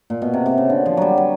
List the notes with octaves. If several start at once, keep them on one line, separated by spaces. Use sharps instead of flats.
A#2
B2
C3
C3
C#3
D3
F3
F#3 G3
F#3